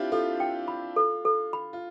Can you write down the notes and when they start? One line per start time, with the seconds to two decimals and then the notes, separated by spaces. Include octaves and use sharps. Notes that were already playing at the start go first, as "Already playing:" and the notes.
Already playing: C4 D4 E4 F4 G4
0.12 F4 A4
0.40 G5
0.68 B5
0.96 A4
1.25 A4
1.53 B5
1.73 F4